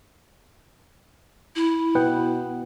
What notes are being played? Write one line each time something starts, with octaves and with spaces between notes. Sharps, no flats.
E4
B2 B3 F#5 G5